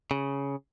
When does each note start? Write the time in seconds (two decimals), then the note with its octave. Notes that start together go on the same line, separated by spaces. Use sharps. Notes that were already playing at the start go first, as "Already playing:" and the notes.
0.11 C#3